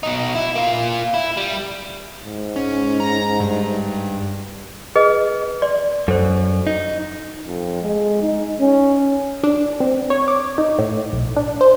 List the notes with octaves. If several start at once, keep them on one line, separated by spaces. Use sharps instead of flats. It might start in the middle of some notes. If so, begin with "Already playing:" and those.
B2 D#4
E4
A#3 F4
E4
G3
G#2
C#4
A#5
G2
G#4 B4 D#5
D5 C6
F#2 A4 C5
D#4
F2
G#3
D#4
C#4
D4
C4
C#5
D6
D#4
A2
B1
D4
C5